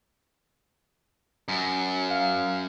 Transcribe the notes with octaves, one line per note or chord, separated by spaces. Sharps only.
F#2
F5